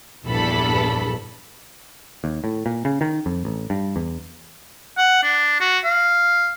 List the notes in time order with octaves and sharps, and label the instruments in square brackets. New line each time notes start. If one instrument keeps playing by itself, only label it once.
[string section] A#1 E2 G2 A4 B5
[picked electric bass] D#2
A2
A#2
C#3
D#3
F2
A1
G2
E2
[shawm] F#5
D4
F#4
F5